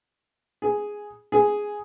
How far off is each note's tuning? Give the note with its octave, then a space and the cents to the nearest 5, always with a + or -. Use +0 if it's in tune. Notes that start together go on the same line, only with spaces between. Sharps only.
G#4 +0
G#4 +0